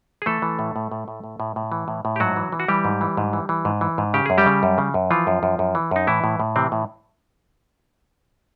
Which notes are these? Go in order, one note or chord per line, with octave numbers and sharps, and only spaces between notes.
G#4
E3 A3 A4
E3
A2
A2
A2
A2
A2
A2
A2
E3
A2
A2
G4
G#2 F#3 F#4
E3
E3
F#4
E3 G3 G4
G#2
E3
G#2
E3
E3
G#2
E3
G#2
C#3 G4
F#2 G#4
G3 G4
C#3
F#2
C#3
F#2
E3 F3 F4
F#2
F#2
F#2
E3
F#2 D#4
A2 E3 E4
A2
A2
C3 E3 C4
A2